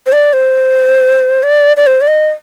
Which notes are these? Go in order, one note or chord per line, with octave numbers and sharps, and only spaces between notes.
C5
D5
C5
D5
D5
C5
D5
D#5